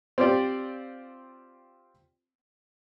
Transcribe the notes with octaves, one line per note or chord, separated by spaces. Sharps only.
C4 F4 G4 D5